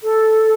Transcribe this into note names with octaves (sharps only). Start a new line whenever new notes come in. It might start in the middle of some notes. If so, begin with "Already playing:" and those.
A4